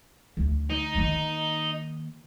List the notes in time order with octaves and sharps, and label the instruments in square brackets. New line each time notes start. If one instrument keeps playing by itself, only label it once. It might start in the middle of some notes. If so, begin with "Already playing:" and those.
[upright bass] D2
[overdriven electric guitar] D#4
[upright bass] D#3 A#3